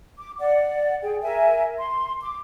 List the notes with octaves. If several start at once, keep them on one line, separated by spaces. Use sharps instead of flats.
D6
D5 F#5
G#4 G5
A#4 E5 G#5
C6
D6